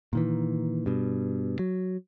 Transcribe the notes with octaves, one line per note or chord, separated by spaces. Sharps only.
A#2 D#3 E3
G2 B2
F#3